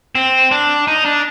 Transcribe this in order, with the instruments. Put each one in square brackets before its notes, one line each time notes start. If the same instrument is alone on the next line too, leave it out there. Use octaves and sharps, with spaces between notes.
[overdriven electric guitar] C4
D4
D#4
D4